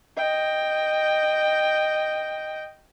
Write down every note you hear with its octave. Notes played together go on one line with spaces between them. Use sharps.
D#5 G5